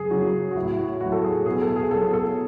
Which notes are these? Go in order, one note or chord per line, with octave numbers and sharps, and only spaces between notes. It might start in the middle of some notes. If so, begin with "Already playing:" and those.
Already playing: F#2 C#3 F#3 G#4
F#2 C#3 F#3 F#4
F#4
A2 F#3 E4
F#4
A2 F#3 F#4
A4
G#4
B2 F#3 G#4
A4
G#4
B2 F#3 A4
A4